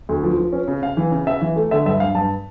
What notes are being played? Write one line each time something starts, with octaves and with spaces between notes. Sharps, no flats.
D2
F3
F3
C#4
C#3
C#3 F5
E3
C#3
C#3 E5
E3
A3
D3 E5
G2 E5
G2 F5
G2 A5